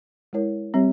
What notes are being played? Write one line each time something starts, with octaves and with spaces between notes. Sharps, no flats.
G#3 E4 A#4 C#5
G3 C4 G4 C#5